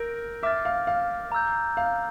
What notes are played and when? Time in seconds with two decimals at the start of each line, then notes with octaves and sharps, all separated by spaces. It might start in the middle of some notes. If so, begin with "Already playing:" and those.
Already playing: A#4 E6 G6 A#6 D7
0.43 E5 D6 F6 A6
0.65 F5
0.87 F5
1.32 A#5 E6 G6
1.77 F5